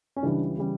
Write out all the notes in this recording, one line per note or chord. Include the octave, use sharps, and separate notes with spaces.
C#4
C#2 C#3 E3 G3 D4
C#3 E3 G3